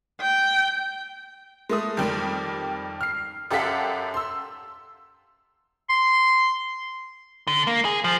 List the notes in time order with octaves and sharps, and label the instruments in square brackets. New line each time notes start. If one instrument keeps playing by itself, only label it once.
[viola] G5
[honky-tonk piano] G#3 A3 D#6
F2 D#3 G3
F6 C7
F#2 G4 A4 F5 F#5 B6
C6 E6
[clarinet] C6
[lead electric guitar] D3
A#3
G#4
F3